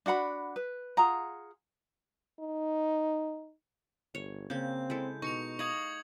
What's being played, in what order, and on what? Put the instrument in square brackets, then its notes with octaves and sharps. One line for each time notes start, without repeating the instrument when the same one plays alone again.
[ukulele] D4 F#4 F#5 B5
B4
F4 G#4 F#5 A#5
[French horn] D#4
[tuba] G1 [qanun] C#5
[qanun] C#3 A#3 [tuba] C4 [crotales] G6
[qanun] G#3 E4 A4
[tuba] B2 [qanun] D#4 [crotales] C#6 C#7 F7
[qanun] D#5 F5 [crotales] D#6 G#6 F#7